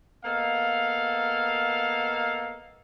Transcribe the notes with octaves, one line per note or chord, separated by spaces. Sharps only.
A#3 B3 A4 D#5 F5